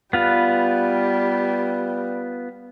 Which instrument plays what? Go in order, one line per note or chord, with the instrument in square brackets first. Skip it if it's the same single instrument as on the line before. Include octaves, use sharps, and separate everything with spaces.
[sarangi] G3 [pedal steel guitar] B3 F4 B4